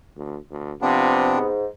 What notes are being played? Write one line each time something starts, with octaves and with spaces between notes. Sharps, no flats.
D2
D2
C3 F3 B3 C4 D4
G#2